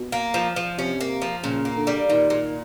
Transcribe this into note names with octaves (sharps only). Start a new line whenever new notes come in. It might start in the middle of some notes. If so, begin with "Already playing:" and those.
Already playing: B2
A#3
F3
F3
C3 C#4
A#3
F3
A#2 C#3
A#3
D3
G3
A#2 D#3
A#2